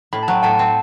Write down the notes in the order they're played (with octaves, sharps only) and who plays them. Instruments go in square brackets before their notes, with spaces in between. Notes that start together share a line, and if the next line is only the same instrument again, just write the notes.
[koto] A2 [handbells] B5
[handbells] A5
[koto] F#3 [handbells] G5
[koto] A2 [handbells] F#5 A5
[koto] C4